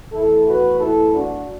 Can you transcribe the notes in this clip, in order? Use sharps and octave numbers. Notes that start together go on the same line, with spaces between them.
E2 E3 A3 E4 A4
F#4 B4
E4 A4
D4 F#4